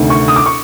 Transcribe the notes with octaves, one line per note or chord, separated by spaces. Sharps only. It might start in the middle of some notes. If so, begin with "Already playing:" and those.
Already playing: D2 C3 D#3
C#6
D#6
D6
C#6